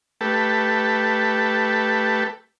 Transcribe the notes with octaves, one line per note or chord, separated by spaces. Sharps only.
A3 G4 A4 B4